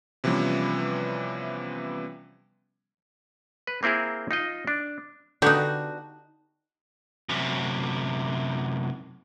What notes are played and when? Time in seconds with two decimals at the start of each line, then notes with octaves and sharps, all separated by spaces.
0.24 C3 E3 F3 G3 B3 C#4
3.67 B4
3.83 A#3 C4 E4 G#4 A#4
4.31 D#4 F4 D#5
4.67 D4
5.42 D3 B3 D4 D#4 F#4 G4
7.29 F#2 C3